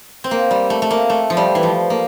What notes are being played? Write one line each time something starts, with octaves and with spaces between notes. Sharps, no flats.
C4
A#3
G3
A3
A3
A#3
A3
F3
G3
E3
F3
A#3